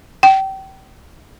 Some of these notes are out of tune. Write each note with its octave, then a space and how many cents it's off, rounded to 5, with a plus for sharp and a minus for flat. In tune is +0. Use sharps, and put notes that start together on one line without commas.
G5 -30